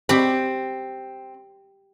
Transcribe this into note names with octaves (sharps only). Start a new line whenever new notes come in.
C4 G4 B5